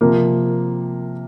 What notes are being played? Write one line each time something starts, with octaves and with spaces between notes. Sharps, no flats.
C3 F3 A#3